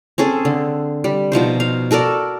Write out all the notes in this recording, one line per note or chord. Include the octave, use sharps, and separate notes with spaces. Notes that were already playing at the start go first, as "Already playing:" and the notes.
C4 C#4 G#4 A4
D3
G3
B2 F3 D#4 C5
F5
F#4 A4 A#4 D5